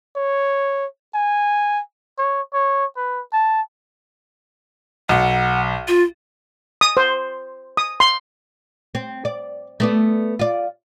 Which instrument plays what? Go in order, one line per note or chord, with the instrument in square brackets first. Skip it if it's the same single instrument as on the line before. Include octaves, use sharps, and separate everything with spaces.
[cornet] C#5
G#5
[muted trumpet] C#5
C#5
B4
A5
[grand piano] B1 [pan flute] F#5
[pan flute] F4
[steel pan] D#6
C5
D#6
C6
[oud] C4
D5
A3 B3 D5
F4 D5